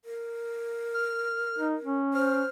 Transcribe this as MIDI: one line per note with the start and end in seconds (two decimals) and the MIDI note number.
0.05 1.96 70
0.94 1.67 89
1.59 1.76 63
1.84 2.43 61
2.14 2.48 72
2.14 2.49 89